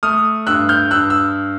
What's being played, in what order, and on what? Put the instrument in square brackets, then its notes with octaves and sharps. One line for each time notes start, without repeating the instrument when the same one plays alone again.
[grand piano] A3 D#6 F6
G2 E6 F#6
F6 G6
G2 E6 F#6
E6